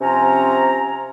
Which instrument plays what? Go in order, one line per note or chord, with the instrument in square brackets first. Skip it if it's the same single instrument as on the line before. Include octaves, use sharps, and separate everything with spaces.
[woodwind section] C3 F3 C#4 A#5